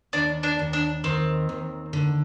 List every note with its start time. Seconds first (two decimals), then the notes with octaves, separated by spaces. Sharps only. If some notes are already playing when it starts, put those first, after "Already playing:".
0.13 D#2 D4
0.43 D4
0.59 D#2
0.73 D4
1.04 D#3 C4
1.49 D#2
1.93 D3